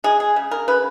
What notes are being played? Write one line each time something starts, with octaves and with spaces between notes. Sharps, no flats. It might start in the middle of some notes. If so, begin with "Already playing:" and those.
G#3 G#4
G#4
C#3
A#4
C#3 B4